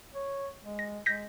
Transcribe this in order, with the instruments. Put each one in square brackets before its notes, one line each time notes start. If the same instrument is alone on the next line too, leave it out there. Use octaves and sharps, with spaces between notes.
[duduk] C#5
G#3
[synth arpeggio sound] A#6
[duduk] G#3 [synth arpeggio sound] G6 A#6 B6